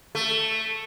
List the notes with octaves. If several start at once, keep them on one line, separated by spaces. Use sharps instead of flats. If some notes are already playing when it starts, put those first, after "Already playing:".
A3